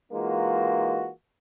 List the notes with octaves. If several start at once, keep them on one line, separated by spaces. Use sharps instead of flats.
E3 G#3 A#3 D#4 F4 F#4